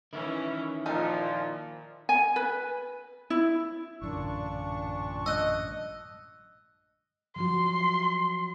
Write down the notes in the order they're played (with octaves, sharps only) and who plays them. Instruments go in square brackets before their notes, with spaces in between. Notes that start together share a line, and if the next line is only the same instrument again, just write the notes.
[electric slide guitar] D#3 E4 [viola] E3 C#4
[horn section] A#2 [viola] F3 [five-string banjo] D#4 A4 A#4
[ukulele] G#5
B4
E4
[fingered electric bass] A1 F#2 D3 [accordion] A#2 D4 C#6
[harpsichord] D#5 [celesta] E6 F#6
[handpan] F3 F#3 F#4 [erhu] C6